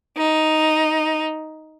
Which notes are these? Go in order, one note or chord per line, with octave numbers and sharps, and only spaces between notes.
D#4